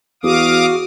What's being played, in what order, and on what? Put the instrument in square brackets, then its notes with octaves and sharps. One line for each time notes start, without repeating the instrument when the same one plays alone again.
[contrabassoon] E2 [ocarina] F#4 [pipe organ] F5 D6 D#6